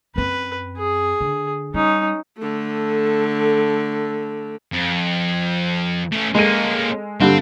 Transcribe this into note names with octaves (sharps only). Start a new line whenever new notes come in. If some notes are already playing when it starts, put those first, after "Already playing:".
F#2 C4 B4
G#4
D3
G3 C#4 D#4
D3 A3
F2
A3 C#4
G#3 A#3 C#4 A4 D#7
G2 D3 G3 C4